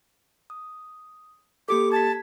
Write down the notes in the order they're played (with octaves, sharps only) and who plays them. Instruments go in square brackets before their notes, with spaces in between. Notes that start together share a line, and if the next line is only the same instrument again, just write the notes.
[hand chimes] D#6
[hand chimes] A#3 G4 A4 [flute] D6
[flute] A5 [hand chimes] G#6 B6